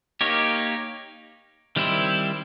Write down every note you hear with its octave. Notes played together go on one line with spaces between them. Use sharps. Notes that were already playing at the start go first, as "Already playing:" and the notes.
A#3 D#4 G4 A#4 C#5
D#3 G3 C4 E4